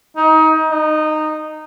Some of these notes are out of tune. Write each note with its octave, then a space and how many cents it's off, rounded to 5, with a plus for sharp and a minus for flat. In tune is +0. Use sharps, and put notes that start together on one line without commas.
D#4 +25
D#4 -15